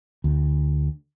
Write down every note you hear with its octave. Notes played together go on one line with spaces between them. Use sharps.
D2